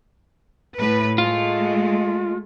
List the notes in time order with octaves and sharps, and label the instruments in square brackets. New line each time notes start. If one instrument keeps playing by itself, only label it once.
[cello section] A2 B4
[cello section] G#3 A3 [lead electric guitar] F4